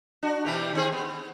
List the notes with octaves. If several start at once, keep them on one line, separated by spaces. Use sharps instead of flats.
D4 F#4
B2 E3 G4
D#3 C4 G#4
B3